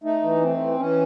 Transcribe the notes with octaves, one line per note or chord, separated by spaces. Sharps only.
A3 D#4
E3
A3 C4
E3
E3 C#4